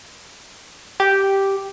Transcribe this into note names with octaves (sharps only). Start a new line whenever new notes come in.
G4